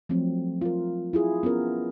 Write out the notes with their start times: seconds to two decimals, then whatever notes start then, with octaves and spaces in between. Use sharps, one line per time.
0.09 F3 F#3 A3 C4
0.61 F4 A#4
1.13 E4 F4 G#4
1.43 B3 C#4 F4 A#4